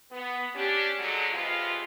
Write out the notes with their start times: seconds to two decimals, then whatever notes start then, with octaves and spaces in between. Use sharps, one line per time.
0.11 B3
0.55 C#4 D4 G4
0.98 D3 F#3 G#3
1.32 F2 C3 G#3 B3 F4